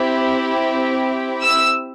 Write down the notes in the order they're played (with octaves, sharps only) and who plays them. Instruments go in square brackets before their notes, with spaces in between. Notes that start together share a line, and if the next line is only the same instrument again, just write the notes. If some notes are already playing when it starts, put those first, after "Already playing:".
Already playing: [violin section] C4 E4 G4
E6